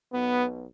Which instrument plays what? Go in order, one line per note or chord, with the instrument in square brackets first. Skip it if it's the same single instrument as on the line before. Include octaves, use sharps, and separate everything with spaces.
[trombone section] B1 B2 B3